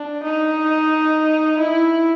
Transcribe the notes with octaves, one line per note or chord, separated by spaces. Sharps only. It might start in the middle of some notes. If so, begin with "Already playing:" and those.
Already playing: D4
D#4
E4